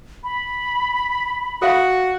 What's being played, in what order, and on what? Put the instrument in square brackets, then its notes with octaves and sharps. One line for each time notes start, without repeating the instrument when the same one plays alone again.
[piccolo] B5
[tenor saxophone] F#4 [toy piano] A4 F5